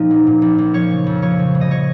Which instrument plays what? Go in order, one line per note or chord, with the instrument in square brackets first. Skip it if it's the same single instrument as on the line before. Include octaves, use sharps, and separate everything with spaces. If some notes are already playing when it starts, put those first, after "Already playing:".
Already playing: [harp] A#2 F3 A#3 C#4 D#4
A#1
A#2
A#1
A#1
F3 C#5
C#3
F2
F3 C#5
C#3
G1
D#5
C#5